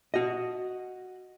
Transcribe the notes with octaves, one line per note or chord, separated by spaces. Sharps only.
F#4 D#5